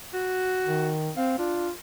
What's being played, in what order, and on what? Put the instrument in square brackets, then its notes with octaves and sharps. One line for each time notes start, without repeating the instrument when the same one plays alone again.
[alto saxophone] F#4
[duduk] D#3
[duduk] C4 [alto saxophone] F5
[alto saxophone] D4 [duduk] F4